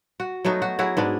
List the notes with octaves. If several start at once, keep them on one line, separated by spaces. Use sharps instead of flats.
F#4
F#3 A3 B3 D#4
F#4
F#3 E4 F#4 G#4
G#2 B3 D4